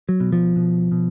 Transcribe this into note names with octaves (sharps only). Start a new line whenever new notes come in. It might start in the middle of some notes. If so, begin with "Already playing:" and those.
F#3
B2
F3
B2
B2